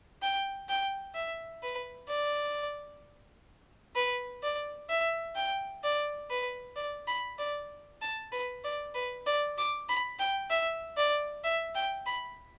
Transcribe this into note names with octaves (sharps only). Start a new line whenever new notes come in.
G5
G5
E5
B4
D5
B4
D5
E5
G5
D5
B4
D5
B5
D5
A5
B4
D5
B4
D5
D6
B5
G5
E5
D5
E5
G5
B5